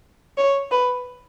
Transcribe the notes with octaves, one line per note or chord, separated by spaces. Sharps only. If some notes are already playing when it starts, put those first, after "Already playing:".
C#5
B4